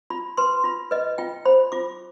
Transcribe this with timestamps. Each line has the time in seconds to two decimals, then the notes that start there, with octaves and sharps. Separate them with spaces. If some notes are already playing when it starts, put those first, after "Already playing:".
0.10 F4 B5
0.37 B4 C6
0.64 F4 B5
0.91 B4 D#5
1.18 F4 G5
1.45 C5 B5
1.72 F4 D6